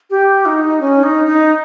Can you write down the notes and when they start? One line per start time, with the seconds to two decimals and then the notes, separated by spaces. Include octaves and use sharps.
0.10 G4
0.46 D#4
0.80 C#4
1.03 D#4
1.26 D#4